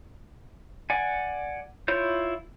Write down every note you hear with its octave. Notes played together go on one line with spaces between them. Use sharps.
D5 F#5 G#5
E4 F4 C#5 G6